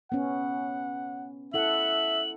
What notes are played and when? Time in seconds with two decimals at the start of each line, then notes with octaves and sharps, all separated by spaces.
0.12 B3 C#4 F#5
1.54 E4 A4 E5 F#5 F#7